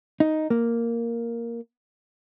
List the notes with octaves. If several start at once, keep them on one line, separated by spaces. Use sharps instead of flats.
D#4
A#3